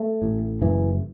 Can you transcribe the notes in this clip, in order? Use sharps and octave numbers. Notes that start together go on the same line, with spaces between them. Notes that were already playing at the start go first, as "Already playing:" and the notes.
Already playing: A3
A1 A2
F#1 F#2 C#3 E3